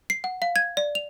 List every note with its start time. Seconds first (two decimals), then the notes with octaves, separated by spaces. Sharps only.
0.10 C7
0.24 F#5
0.42 F5
0.56 G#6
0.77 D5
0.95 F7